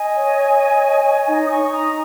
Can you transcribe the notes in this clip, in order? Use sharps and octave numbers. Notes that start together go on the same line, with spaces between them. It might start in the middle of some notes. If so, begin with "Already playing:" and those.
Already playing: D#5 G#5
C#5
C#5
C#5
C#5
C#5
D#4
D#6
D#4 G#5 C#6
D#4 A#5 D#6